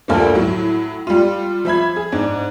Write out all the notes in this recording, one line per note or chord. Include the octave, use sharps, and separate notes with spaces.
D2 G2 D3 F3 A3 A#3
A2 F#3
G3 F4
F3 E5 B5 G#6
G#4
G#2 D4